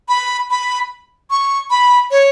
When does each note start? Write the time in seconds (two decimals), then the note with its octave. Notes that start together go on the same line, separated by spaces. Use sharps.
0.09 B5
0.50 B5
1.31 C#6
1.71 B5
2.11 C#5